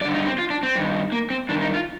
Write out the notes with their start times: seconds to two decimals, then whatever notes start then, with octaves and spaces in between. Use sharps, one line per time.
0.01 G2 D5
0.05 D3
0.14 D#4
0.26 C4
0.39 F4
0.50 D4
0.63 C4
0.75 G2 D#3
1.12 A#3
1.30 C4
1.49 G2 D#3 D4
1.61 D#4
1.74 F4